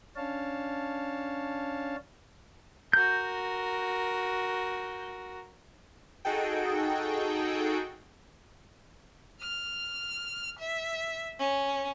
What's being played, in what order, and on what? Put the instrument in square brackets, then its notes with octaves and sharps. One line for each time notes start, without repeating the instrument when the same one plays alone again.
[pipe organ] C#4 D4 C#5 F5 A5
[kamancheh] F#4 A#4 [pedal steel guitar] G6
[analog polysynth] D#4 F#4 G#4 A4 G5
[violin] F6
E5
C#4